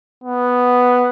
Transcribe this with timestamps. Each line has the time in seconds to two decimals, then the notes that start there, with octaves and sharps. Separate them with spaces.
0.24 B3